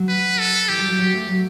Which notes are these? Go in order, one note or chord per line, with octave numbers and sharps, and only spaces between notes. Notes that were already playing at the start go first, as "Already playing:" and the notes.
Already playing: F#3
B4
A4
E3 G4
G3
F#3
F#3
A3
F#3